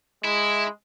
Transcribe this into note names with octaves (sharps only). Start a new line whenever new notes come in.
G#3 E4